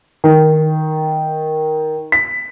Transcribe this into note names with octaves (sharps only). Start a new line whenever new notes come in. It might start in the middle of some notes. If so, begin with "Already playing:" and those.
D#3
B6